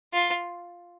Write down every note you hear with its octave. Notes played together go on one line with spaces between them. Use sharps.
F4